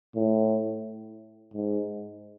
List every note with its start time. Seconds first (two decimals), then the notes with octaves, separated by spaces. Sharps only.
0.16 A2
1.54 G#2